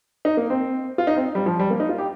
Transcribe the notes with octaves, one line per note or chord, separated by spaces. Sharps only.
D#4
A#3
C4
F4
D#4
C4
G3
F3
G3
A#3
D#4
F4
G4